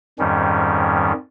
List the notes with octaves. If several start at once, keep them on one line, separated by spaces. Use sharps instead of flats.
F2 G#2 D#3 G3 C#4